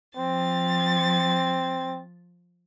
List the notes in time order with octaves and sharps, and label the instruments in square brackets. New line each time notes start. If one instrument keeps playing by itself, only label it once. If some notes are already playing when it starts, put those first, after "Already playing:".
[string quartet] F3 A6 [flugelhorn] C4